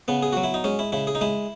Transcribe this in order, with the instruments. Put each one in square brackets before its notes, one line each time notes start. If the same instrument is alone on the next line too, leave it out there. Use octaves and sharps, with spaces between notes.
[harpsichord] C#3 B3
G#4
F#3 F#4
E4
D#4
G#3 C#4
E4
C#3 E4
G#4
D#4
G#3 E4